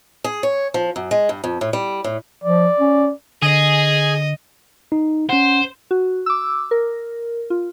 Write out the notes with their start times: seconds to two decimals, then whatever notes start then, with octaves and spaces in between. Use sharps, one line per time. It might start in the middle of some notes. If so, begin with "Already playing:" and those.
0.24 G#4
0.43 C#5
0.74 F3
0.96 F#2
1.11 G#3
1.29 G2
1.44 F2
1.61 A2
1.73 G3
2.04 A2
2.44 F3 D5
2.79 C#4
3.42 D3 G#4 D#5
4.92 D#4
5.29 C#4 C5 F#5
5.91 F#4
6.26 D6 E6
6.71 A#4
7.50 F4